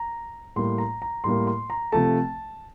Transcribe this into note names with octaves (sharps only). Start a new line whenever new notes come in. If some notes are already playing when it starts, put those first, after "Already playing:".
Already playing: A#5
A2 G3 A#3 C6
A#5
A#5
A2 G3 A#3 C6
C6
A#5
C3 F3 A3 A5